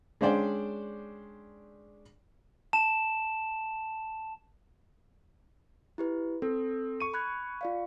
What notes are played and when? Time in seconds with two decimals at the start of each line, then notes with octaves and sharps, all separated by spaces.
0.21 G#3 C#4 D4 C5 D5 G5
2.73 A5 E7
5.98 E4 G4 B4
6.42 C4 A4
7.00 C#6 D#7
7.14 B5 F#6 G#6
7.61 F4 D5 F5